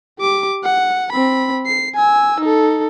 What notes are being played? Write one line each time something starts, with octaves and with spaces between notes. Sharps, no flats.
G4 D6
F#5
C4 B5
C7
G#5 E6
D#4 A4